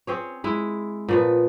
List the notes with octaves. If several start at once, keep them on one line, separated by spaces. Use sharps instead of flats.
C4 G#4 C#5
G#3 E4
A#2 F3 B3